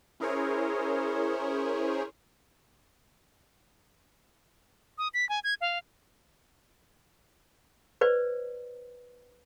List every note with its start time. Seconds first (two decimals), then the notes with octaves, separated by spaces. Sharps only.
0.20 C#4 E4 G#4 A#4 C5 C#5
4.98 D#6
5.14 B6
5.29 G#5
5.44 G#6
5.61 F5
8.01 B4 C5 D5